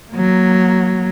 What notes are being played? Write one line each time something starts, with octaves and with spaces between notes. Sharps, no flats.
F#3 A#3